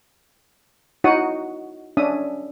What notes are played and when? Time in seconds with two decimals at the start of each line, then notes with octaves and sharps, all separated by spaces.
1.04 D#4 E4 F#4 C#5 F#5 D#6
1.97 C#4 D4 E5 D#6